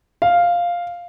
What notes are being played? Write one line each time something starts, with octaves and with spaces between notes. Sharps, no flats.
F5